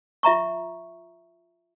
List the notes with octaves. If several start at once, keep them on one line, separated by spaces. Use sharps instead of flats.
F4 E5 A#5 C#6